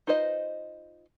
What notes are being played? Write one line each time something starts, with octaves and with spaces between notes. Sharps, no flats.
D#4 F4 B4 C5 D#5